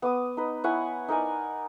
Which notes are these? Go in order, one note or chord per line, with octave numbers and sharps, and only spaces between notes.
B3 D6 D#6
D#4 B4
E4 C#5 F#5 G#5
D#4 A#4 D5 G#5